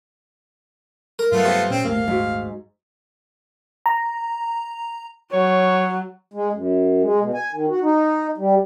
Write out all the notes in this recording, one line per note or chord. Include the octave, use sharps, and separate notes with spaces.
A#4
G2 F#3 G3 A3 B3 F4
C3
A#2 C4 C#4
D#1 G#1 A3 A#3 F5
G#2 F#4
A#5
F#3 C#5
G#3
F#2
G#3
B2
G#5
D#3
F#4
D#4
G3